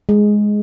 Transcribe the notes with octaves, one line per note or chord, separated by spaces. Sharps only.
G#3